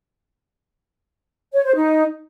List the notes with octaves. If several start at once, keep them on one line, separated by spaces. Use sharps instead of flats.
C#5
C5
D#4